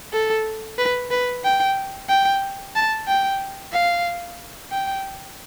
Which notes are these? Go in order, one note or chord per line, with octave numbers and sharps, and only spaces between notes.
A4
B4
B4
G5
G5
A5
G5
F5
G5